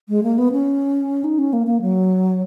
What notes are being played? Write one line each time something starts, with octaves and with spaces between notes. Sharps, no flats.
G#3
A#3
B3
C#4
D#4
C#4
A#3
A#3
F#3